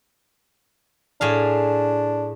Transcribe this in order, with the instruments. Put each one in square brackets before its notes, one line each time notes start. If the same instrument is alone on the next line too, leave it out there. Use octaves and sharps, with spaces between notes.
[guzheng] A2 G#4 F5 [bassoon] D4